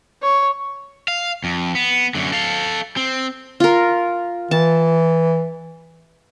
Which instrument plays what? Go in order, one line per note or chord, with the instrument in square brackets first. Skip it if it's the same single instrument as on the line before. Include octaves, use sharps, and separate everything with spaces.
[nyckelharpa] C#5
[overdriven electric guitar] F5
F2
B3
F#2 D3
A4 F5
C4
[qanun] F4 A#4
[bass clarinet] E3 [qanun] A5